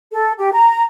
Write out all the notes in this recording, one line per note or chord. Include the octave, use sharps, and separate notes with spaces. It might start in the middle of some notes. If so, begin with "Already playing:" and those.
A4
G4
A#5